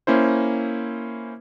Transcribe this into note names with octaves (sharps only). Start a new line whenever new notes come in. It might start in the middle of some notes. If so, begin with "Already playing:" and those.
A#3 C#4 E4 C5